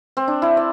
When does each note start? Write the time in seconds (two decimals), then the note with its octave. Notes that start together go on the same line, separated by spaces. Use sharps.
0.17 C4
0.28 D4
0.42 E4
0.57 D5